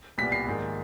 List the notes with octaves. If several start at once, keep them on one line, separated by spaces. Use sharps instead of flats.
C2 A#2 G3 B3 B6
C7
A#1 G#2 D#3